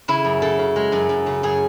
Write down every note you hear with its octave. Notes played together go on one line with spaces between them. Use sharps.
C#3 E4
F#2
C#3 A4
C#3
G#3
F#2
F#2
C#3
F#2 G#4